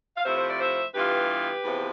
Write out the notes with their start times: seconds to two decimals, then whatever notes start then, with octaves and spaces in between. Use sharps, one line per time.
0.17 F5
0.25 C3 F3 A3 E4 C5 E5
0.38 C5
0.49 D5
0.61 C5 E5
0.95 G2 E3 B3 F4 G4 B4
1.64 E2 C3 F3